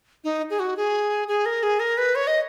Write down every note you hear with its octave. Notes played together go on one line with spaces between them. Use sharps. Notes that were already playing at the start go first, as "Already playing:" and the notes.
D#4
G#4
F#4
G#4
G#4
A#4
G#4
A#4
B4
C#5
D#5